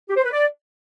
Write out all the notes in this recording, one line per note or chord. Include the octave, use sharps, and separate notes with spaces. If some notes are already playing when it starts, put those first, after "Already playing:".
G4
C5
B4
D5